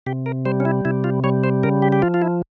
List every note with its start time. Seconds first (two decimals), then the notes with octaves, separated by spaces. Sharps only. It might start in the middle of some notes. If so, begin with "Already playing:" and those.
0.06 C3 G4
0.26 A#4
0.46 G3 C5
0.60 C#4
0.65 E4
0.85 C3 E4
1.04 F4
1.24 G3 C#5
1.44 C5
1.63 C#3 A#4
1.82 G4
1.92 G4
2.02 F3 F4
2.14 F4
2.22 E4